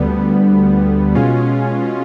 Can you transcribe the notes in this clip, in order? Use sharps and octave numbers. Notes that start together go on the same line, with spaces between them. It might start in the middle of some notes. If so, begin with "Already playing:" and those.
Already playing: D2 D3 G3 B3
B2 G#3 C#4 F4